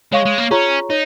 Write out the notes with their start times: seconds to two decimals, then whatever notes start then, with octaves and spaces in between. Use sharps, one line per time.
0.12 G#3 C#5 F5 C#6
0.25 G#3
0.38 A#3
0.51 C#4 F4 G#4 C#5 A#5 C#6
0.90 D#4 C#5